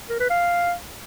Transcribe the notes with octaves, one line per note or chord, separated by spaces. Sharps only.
A#4
B4
F5